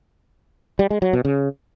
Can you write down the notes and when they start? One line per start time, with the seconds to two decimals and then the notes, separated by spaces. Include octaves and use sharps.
0.79 G3
0.91 G#3
1.02 F#3
1.13 B2
1.25 C#3